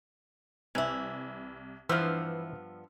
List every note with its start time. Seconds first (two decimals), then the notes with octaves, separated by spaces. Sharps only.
0.75 C2 E3 E4 G#6 F7
1.89 G2 E3 F3 B3 E4 C5 E6 F6